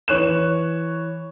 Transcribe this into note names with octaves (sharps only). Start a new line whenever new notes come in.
E3 C#5 F#6 E7